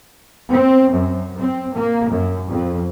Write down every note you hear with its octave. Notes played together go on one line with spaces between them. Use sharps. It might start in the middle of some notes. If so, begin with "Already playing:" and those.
C4
F#2
C4
A#3
F#2
F2